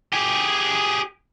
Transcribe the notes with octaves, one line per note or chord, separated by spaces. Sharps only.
G4 G#4